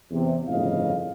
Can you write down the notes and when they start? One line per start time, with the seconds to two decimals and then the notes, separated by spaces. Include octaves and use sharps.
0.11 E2 C3
0.48 G1 F2 A2 C#3 D#5 F5